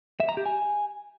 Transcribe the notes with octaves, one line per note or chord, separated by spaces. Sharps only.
E5
A#5
G4
G#5